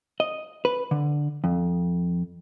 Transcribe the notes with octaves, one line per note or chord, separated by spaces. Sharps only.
D#5
B4
D3
F2